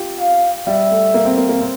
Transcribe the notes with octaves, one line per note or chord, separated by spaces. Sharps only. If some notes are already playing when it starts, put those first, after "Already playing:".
Already playing: F4 G4
F5
G3 E5
A3
A#3
C4
A#3
A#3
C4